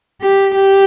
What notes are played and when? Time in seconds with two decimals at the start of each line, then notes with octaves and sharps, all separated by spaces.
0.22 G4
0.55 G4